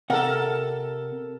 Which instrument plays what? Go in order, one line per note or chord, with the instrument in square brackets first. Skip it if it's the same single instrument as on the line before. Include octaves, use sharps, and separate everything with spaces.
[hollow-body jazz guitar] C3 F#5 [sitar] A4 A#4